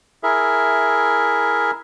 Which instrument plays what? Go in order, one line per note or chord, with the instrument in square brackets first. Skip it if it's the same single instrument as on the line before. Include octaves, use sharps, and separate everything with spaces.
[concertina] E4 G#4 A#4 E5